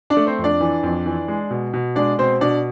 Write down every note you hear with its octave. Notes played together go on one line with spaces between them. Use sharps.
D4 D5
A3
C4 C5
F2
D4 D5
E3
F2
E3
G#3
B2
B2
G#3 D4 D5
B2 C4 C5
B2 D4 D5